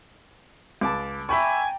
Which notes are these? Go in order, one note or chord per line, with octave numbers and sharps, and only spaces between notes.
C#2 A5 D6
E5 G5 G#5 A#5 B5 C#6